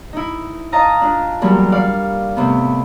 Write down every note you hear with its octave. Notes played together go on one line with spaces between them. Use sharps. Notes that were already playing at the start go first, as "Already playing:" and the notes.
D#4 E4
D#5 F5 A5 A#5 D#6
D4 F4
E2 F#3 G3 A#3 E4
D5 F5 C#6
A2 C3 B3